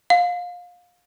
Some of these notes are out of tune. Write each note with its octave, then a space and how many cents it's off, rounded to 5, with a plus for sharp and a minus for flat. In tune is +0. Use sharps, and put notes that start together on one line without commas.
F5 +25